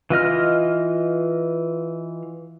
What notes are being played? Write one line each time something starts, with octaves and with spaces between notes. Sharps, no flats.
E3 F4 D#5 F6